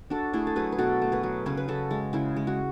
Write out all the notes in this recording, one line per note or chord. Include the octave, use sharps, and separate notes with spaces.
D4 F#4 A4
A3 E4 G#4
A4
F#3 G#4 B4
B4
B2 F#4 A4
A3
G#4 B4
F#3
C#3 G#4 B4
B4
C#3 F#4 A4
G#3
C#3 E4 G#4
G#3
F#4